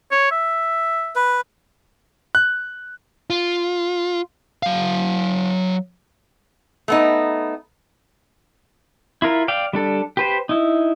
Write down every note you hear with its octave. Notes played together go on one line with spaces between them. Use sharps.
C#5
E5
B4
F#6
F4
F#3 F5
A3 B3 D#4
E4 F4 A#4
D5 F5 G5
G3 D4 A4
G4 B4 C5
D#4 E4